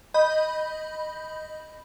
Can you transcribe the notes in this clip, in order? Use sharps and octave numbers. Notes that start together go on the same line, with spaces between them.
D#5 B5 G6